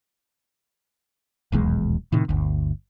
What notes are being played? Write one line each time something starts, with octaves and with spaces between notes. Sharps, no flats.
D#1 B1 E2 G#3
A2 C3 D#3
G1 D2